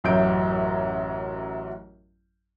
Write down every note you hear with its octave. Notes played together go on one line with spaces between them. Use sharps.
A1 F#2 F#3 E5 G6 D7